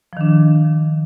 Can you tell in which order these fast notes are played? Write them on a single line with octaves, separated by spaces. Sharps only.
F3 D#3 D4